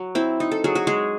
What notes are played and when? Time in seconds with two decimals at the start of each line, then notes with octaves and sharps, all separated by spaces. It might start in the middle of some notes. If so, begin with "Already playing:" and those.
Already playing: F#3
0.15 C4 E4
0.40 D#4
0.51 A4
0.64 F#3 G#4
0.75 F#4
0.87 G#3 G#4